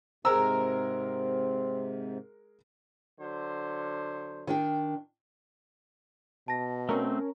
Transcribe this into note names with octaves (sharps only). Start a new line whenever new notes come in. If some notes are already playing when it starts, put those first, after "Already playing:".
G#2 C3 G#3 C4 A#4 A#5 E6
D3 F#3 C5
D#3 D4 G5
B2 A5 A#6
A3 C4 C#4 A#4